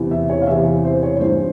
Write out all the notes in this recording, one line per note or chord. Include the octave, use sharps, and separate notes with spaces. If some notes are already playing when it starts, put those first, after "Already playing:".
Already playing: E2 C3 E3
E5
C#5
F5
E2 C3 E3 E5
C5
C#5
G2 E3 C5